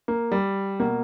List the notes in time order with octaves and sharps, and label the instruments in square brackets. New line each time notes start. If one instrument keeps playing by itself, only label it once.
[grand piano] A#3
G3
B2 A#3